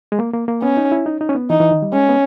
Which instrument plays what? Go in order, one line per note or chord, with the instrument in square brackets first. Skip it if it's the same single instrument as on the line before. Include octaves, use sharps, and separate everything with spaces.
[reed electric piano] G#3
A#3
A#3
A#3
[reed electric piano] B3 [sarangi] C#4
[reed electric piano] D#4
E4
D#4
D#4
C#4
B3
[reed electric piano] E3 [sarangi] D#4
[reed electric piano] E3
D#3
G3
[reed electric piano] G#3 [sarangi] C#4
[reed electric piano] B3